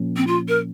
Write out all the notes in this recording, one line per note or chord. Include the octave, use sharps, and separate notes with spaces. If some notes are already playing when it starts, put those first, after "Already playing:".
Already playing: A#2 F3 A#3 C#4
C4
F4
A#4